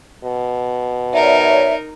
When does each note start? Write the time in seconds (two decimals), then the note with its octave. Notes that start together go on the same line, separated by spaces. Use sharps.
0.24 B2
1.13 D#4 A#4 C#5 D5 E5